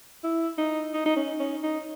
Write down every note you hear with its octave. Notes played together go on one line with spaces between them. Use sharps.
E4
D#4
D#4
D#4
C#4
C#4
D#4